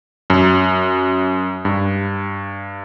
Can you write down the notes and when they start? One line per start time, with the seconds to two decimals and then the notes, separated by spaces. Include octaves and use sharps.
0.30 F#2
1.65 G2